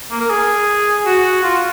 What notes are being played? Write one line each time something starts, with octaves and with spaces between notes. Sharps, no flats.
A#3
A#4
G#4
F#4
F4